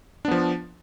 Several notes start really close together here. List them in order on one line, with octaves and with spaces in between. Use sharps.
D4 B3 F3